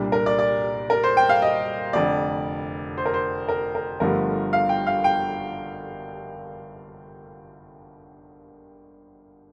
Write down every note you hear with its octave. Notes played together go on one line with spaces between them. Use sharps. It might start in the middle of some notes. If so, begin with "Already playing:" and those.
Already playing: C2 A#2 G3 D4
A#4
D5
D5
A#4
C5
G5
F5
D#5
F1 F2 D3 D5
C5
A#4
C5
A#4
A#4
G1 G2 D3 F3 A3 A#4
F5
G5
F5
G5